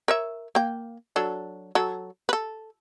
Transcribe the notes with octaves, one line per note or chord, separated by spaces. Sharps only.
A#4 C#5 E5
A#3 G5
F#3 D4 A4
F#3 A4
A4 B4